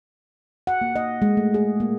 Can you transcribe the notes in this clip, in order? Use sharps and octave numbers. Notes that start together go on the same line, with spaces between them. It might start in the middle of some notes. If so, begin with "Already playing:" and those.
F#5
A#3
D#5
G#3
A3
G#4
A#3